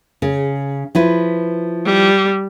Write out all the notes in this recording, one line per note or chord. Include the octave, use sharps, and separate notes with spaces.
C#3
F3 E4 B4
G3